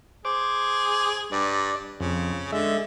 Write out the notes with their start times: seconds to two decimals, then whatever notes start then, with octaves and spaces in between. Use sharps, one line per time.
0.25 G#4 C5 D6
1.32 G2 D5
2.00 F2 C#3
2.52 D3 G#3 E5